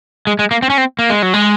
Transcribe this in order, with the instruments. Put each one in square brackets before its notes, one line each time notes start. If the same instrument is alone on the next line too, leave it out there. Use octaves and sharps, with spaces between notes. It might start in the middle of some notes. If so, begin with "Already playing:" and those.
[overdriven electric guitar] G#3
G#3
A#3
C4
C#4
C4
A#3
G#3
F#3
G#3